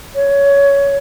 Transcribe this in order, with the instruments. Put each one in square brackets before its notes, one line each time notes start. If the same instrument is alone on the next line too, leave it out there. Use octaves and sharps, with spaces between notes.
[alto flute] C#5